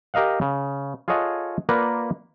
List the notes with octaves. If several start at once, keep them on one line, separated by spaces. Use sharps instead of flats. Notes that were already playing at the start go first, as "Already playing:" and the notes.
G4 A#4 D#5 F5 F#5
C#3
F4 G#4 A4 C#5 D#5 F#5
A#3 F4 A#4 B4 D5 F#5